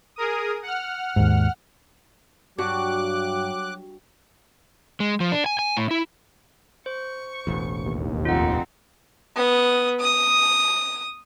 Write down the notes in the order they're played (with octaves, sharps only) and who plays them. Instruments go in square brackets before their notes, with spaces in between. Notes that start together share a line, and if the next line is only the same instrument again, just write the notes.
[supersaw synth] G#4 A#4 D#6
F#5 F6
[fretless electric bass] D#2 G#2
[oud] G2 [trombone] F#3 [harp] F#4 [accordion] D6 F#6
[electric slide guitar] G#3
F3
D4
G#5
G#5
A2
E4
[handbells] C5 [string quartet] C#6
[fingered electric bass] E1 A1
[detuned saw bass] D#2
[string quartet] F2 C4 D#4 [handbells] F4 F#5
[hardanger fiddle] B3 D#6
D#6